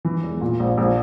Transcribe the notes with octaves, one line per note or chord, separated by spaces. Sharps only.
E3
E1
A#2
A#1
A#1